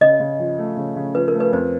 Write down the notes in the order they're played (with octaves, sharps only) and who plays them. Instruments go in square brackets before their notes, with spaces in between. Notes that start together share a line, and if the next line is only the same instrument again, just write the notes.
[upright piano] C#3 [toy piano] D#5
[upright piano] C#3
F3
A3
C#3
C#3
[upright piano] F3 [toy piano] B4
[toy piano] A#4
[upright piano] A3
[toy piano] B4
[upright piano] F2 [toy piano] C5